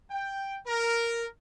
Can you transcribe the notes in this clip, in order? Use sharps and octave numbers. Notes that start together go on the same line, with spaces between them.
G5
A#4